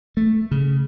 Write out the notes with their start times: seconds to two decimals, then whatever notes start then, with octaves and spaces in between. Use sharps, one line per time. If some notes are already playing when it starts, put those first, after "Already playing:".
0.17 A3
0.51 C#3